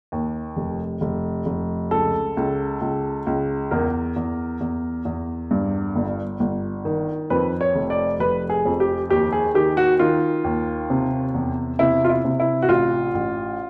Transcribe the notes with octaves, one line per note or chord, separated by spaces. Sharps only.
D#2
F1
F1
F1
C#2 A4
C#2
C#2
C#2
E2 A#4
E2
E2
E2
G2
G1
G1
D#3
F2 B4
C#5
F1
D5
F1 B4
G#4
F2
G4
D#2 G4
G#4
D#3 G4
F#4
D#3 F4
D#2
C3
E2
C3 E4
F4
E4
C3
E4
F#4
A1 F4
A1